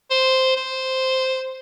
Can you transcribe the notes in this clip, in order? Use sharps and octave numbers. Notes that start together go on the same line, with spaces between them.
C5
C5